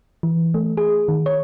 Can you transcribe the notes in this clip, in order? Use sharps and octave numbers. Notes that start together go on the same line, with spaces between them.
E3
A3
G#4
D#3
C#5